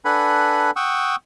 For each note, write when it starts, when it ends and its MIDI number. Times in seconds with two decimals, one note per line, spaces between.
0.05 0.71 62
0.05 0.71 69
0.05 0.71 71
0.05 0.71 78
0.05 0.71 80
0.05 0.71 83
0.76 1.16 78
0.76 1.16 79
0.76 1.16 85
0.76 1.16 87
0.76 1.16 88